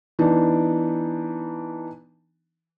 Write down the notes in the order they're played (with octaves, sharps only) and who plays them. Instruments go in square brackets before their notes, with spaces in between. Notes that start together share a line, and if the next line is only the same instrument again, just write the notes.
[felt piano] E3 B3 D4 D#4